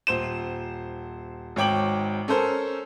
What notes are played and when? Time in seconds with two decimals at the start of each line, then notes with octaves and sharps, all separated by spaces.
0.07 D#1 C5 E7
1.56 G#1 C#5 G5 D6 F#7
2.28 C#4 A4 A#4 C5